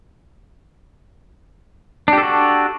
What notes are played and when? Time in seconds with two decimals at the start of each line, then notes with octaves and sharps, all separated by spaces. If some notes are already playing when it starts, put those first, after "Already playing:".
2.08 D4
2.13 G4
2.18 A4
2.23 F#4